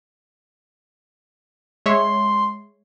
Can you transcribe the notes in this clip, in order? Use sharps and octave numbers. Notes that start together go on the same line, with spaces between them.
G#3 C#5 E5 C6